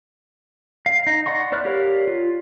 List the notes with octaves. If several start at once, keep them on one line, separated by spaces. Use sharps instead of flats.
F5
D#4
D5 F#5 C6 C#6
E4 C5 D5 F6 F#6
G4 A#4 C#5 D5 F5
F4